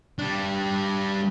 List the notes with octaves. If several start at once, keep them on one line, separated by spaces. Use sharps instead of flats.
G3 D4